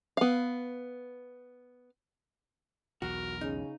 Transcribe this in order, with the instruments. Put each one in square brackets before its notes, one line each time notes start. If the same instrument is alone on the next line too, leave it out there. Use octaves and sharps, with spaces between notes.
[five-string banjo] B3 F5
[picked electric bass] B1 E2 [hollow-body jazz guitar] F#4 [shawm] A#4
[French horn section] C#3 [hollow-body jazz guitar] D#4